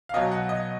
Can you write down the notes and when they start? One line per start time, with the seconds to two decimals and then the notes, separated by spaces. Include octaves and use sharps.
0.09 F5
0.14 B2 F#3 D#5
0.32 F#5
0.49 D#5